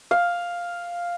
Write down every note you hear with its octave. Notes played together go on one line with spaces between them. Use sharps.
F5